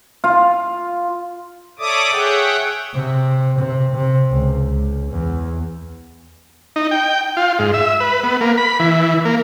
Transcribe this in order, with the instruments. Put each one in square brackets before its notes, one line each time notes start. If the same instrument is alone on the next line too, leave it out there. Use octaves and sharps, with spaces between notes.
[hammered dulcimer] F4
[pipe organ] A4 C#5 D5 E5 D6 D#6
G#4 C#5 E5 F#5 G5
[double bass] C3
C3
C3
C#2
C#2
E2
[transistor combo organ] D#4
G5
F4
G#2
E5
B4
B3
A#3
B5
E3
A#3